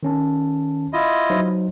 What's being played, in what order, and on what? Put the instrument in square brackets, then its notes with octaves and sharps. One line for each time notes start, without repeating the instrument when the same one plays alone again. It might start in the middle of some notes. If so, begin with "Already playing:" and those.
[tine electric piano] D#3 C#4 A5
[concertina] E4 F4 D#5
[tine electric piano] F#3 D#4 C5